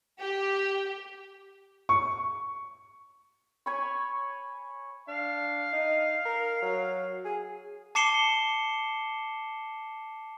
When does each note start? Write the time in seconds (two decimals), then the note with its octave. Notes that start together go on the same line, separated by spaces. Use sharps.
0.18 G4
1.89 C#6
3.66 C#5 G#5 B5 C#6
5.08 D4 F5
5.72 D#4
6.25 A#4
6.62 F#3
7.25 G#4
7.95 A5 D6 C7 C#7 E7 G7